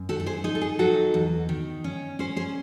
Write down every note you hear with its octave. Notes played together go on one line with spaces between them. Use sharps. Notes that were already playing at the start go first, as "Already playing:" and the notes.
Already playing: F#2
D#3 F#4 A4
A4
G#4 C5
D#4 G#4
A4
G#4
F#3 F#4 A4
E2
D#3
C#4
C#4 G#4 C5
G#4 C5